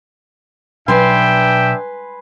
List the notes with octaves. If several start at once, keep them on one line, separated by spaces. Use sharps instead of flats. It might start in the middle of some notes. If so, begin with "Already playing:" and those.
B2 F#3 D4 B4 E5 G5 G#5 C6